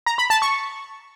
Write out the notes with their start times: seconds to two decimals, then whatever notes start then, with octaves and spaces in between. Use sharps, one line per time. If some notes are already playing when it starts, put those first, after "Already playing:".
0.06 A#5
0.18 B5
0.30 A5
0.42 C#6